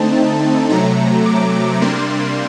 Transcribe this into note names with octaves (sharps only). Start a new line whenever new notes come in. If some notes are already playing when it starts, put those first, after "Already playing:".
Already playing: D3 A3 C4 D#4 A5
C3 F#3 A3 A#5
D6
C3 G3 A#3 D4 C6